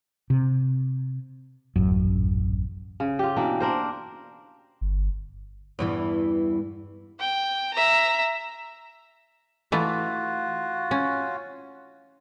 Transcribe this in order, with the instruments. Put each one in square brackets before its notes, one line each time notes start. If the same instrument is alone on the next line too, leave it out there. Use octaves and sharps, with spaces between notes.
[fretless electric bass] C3
D#1 A1 F#2
[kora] C#3
F4 G4
B2 E3 A#3 D4
D4 A#4 C5
[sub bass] G1
[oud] E2 G2 E3
[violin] G5
E5 A#5
[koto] E3 A3 [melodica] F4 F#4
[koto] C#4